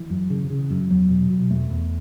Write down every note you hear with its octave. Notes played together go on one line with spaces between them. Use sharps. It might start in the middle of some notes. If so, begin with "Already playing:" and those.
Already playing: E3
F#2
C#3
C#3
F#2
E2 F#3
B2
B2
E2 A3
E2